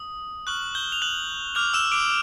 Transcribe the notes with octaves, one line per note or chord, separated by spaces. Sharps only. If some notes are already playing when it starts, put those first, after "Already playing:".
Already playing: D#6
C#6 F6 F#6 F#7
G6 G7
F7
F#6 F#7
D6 F6 G6 F7
E6 E7
D6 D7